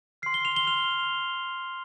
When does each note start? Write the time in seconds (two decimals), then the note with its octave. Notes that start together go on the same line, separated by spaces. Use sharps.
0.22 F6 C7
0.26 C6
0.34 G7
0.45 F7
0.56 G7
0.67 F6 F7
0.71 C6